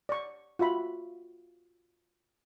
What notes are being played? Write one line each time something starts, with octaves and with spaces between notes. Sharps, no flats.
D5 C#6
F4 F#4 E5 B5